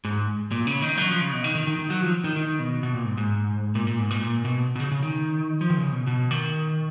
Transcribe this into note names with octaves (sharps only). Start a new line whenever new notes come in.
G#2
A#2
C#3
D#3
F#3
F3
C#3
B2
D#3
D#3
D#3
D#3
F#3
F3
D#3
D#3
B2
B2
A#2
G#2
G#2
A#2
A#2
G#2
A#2
A#2
B2
B2
C#3
C#3
D#3
F3
D#3
C#3
B2
B2
D#3